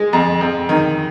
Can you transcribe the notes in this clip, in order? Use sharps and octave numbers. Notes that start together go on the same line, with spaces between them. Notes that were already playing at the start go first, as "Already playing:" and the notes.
Already playing: G#3
F2
F2
D#3